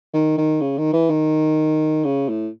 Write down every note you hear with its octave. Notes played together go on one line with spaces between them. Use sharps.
D#3
D#3
C#3
D#3
E3
D#3
C#3
A2